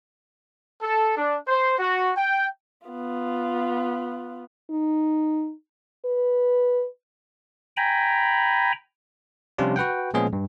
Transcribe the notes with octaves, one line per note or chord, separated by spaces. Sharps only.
A4
D4
C5
F#4
G5
B3 F4
D#4
B4
G5 G#5 A#5 B5
C3 F3 G3 C#4 D4 F4
F#4 B4 F#5 G5
A#2 F3 G#3 B3 C#4 G#4
G2